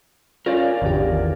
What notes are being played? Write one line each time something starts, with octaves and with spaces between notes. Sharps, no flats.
C#4 F4 A#4 D5 F5
G#1 E2 D3 G4
D#3